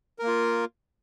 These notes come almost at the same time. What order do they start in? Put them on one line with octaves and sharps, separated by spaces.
A#4 A#3 F4